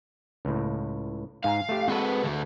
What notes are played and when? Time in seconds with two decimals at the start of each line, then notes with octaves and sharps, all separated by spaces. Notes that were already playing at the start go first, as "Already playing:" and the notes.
0.45 C#2 A2
1.44 G#2 F5 G#5 A#5
1.69 A3 G4
1.88 G#3 C4 F#4 A4 B4
2.24 D3 A3